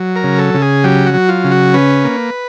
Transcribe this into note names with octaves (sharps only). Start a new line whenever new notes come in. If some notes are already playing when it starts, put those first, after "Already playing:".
Already playing: F#3
A#4
C#3
A4
C#3
G#4
F#3 G4
F#4
F#3
F4
C#3
F#4
C#4 B4
A#3